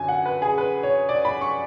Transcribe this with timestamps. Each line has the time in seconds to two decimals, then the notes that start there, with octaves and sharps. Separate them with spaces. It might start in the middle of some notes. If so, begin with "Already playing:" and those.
Already playing: F#2 D3 F#3 G#5
0.08 F#5
0.25 B4
0.42 G#4
0.58 B4
0.83 C#5
1.09 D5
1.25 B5
1.41 C#6